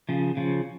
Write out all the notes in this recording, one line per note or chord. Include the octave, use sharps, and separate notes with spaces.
C#3 F3
C#3 F3